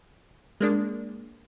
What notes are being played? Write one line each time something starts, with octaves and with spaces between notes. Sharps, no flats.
G#3 A#3 D4